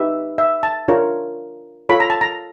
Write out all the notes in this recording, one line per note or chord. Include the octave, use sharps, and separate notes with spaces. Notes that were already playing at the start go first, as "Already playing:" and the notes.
Already playing: D#4 G4 B4 E5
E5
A5
D4 F4 A#4 C#5
F4 A4 C#5 B5
A#5
A5
A#5